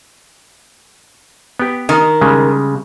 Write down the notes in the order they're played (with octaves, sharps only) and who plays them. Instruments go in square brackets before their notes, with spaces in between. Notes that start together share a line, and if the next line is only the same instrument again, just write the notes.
[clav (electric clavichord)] B3 G4
[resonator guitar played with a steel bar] D#3
[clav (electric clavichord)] C#3 G3 G#3